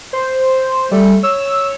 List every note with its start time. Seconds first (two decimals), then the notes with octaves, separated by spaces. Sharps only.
0.13 C5
0.91 G3 A3
1.23 C#5 E6